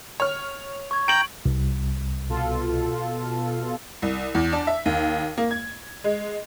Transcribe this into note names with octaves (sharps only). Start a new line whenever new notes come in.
C#5 F6
C#6 G#6
G5 A#5 G6 D7 F#7
C2
B2 F4 A4
C2
E2
D4
E5
D#2
A#3
G#6
G#3